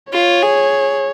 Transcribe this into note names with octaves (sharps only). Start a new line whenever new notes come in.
F4 C#5
G#4